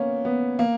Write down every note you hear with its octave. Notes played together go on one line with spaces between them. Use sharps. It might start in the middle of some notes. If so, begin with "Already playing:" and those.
Already playing: A#3 B3 C#4
B3
A#3